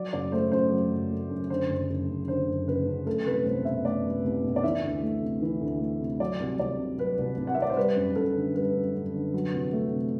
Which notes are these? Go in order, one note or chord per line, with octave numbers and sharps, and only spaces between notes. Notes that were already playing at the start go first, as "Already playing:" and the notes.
Already playing: F#3 D5
F#1 D5
A3 C5
F#2 C5
F#3
F#1
A3
F#2
D3 C5
F#1
F#1
F#2
D3 C5
F#1
F#1 B4
F#2
A3 A4
C2 B4
C2 C5
B2 E5
A3 D5
C2
C2
B2
D5
E3 E5
D2
A3
C3
E3
D2
A3
C3
F#3 D5
C2
C2 D5
C3
F#3 B4
C2
C2
F#5
E5
C3 D5
C5
G3 B4
F#2
F#2 A4
D3
G3 B4
F#2
F#2
D3
F#3
C2
A3
C3